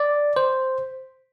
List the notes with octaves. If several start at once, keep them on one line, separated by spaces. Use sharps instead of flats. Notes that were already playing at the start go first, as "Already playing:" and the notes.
Already playing: D5
C5